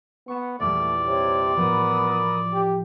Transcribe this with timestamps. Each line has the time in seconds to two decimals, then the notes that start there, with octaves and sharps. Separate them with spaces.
0.28 B3 C#6 E7
0.60 A#1 E2 G3 A3 D5
1.06 C3 C#5
1.57 A2 F3 B3 A#4 B5 D#6
2.53 G4